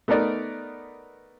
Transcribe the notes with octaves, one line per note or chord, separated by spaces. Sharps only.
A3 B3 D#4 A#4 D5